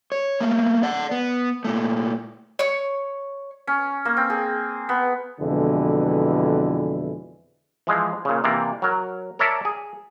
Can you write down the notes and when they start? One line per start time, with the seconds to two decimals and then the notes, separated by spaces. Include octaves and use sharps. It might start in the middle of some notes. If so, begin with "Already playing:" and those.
0.12 C#5
0.41 A3 A#3
0.83 D5 F#5
1.11 B3
1.64 A#2 A3
2.59 C#5 C#6
3.67 C#4
4.05 A#3
4.17 C4
4.30 G#4
4.89 B3
5.40 F2 B2 D3 E3 G#3 E4
7.87 E3 F3 G#3
8.25 A#2 C#3
8.44 C3 E3 A#3 D5
8.82 F#3 A#4
9.39 A#4 C#5 D5 E5 A5
9.65 G#4